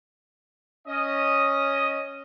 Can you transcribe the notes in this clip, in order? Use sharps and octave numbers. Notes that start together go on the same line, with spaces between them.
C#4 D#5